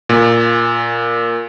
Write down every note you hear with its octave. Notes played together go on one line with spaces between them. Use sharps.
A#2